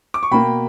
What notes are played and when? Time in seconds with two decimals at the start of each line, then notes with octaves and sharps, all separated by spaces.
0.14 D6
0.23 C#6
0.31 B2 A#3 G5 B5